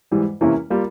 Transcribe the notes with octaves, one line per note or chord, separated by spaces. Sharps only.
G#2 E3 G3
C3 E3 A#3 C#4 E4
G3 A#3 F4